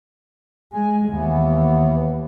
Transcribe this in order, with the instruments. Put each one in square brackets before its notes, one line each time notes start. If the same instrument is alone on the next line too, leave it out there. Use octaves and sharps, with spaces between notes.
[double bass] G#3 [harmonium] G#5
[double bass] D#2 [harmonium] E3 B3